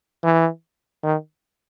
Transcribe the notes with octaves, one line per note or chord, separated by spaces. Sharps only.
E3
D#3